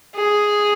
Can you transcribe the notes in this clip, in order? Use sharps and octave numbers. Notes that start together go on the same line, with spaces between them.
G#4